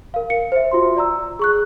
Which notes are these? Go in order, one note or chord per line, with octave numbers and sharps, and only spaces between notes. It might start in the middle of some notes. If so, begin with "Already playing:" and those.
A#4 F5
C#7
C5 E5
F4 F#4 C6
D5 A#5 E6
G#4 C#6 F#6